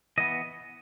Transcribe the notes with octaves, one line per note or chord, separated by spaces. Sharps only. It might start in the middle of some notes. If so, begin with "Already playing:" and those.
E3 B3 D#5